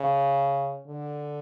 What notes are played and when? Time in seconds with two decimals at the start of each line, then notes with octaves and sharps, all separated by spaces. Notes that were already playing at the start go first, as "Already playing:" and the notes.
Already playing: C#3
0.87 D3